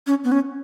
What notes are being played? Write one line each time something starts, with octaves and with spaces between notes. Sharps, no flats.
C#4
B3
C#4